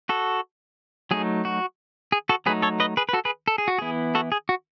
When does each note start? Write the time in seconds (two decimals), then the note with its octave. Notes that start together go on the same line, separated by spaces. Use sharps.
0.09 F#4 A4
1.11 F#3 A3 D#4 G#4
1.45 F#4
2.12 G#4
2.29 F#4 A4
2.46 F#3 A3 D#4 G#4 B4
2.62 A4 C#5
2.80 B4 D#5
2.97 G#4 B4
3.09 B4
3.13 F#4 A4
3.25 G#4 B4
3.48 A4
3.58 G#4
3.68 F#4
3.78 E3 B3 E4 G#4
4.15 F#4 A4
4.32 G#4
4.49 F#4